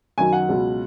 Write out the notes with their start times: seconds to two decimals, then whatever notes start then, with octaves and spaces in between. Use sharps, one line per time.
0.18 F#2 D#3 F#3 G#5
0.33 F#5
0.49 C#2 B2 F#3